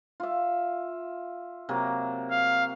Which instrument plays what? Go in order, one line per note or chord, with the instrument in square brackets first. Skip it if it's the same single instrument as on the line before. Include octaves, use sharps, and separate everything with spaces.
[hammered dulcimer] F4 E5
C3 F#3 A#3
[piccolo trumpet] F5